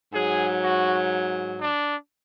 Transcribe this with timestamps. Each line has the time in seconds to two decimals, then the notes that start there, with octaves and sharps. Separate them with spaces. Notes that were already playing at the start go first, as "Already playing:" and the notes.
0.13 G#2 F#3 G#4
0.62 F#4
1.60 D4